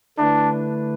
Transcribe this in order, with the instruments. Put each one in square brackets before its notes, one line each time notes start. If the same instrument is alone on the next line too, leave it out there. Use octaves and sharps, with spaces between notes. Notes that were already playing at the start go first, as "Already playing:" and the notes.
[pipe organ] D3 A3 E4 B4 [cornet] D4